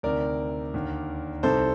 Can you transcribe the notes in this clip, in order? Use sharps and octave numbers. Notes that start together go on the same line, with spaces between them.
D2 C3 D#3 A#4 D5
D#2 D3
C2 C3 D#3 A4 C5